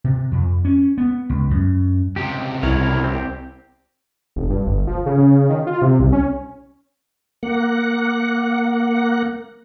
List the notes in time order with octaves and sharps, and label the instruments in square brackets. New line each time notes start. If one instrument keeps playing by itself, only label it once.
[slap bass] C3
F2
C#4
B3
C#2
F#2
[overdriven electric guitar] C#2 C3 [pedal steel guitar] G4
[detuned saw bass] C2 [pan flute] E4 [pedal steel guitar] A#4 C#5
[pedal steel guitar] C4 G4
[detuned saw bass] F1
G2
G1
F3
C#3
C#3
D#3
F4
C3
C2
C#4
[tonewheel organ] A#3 F#5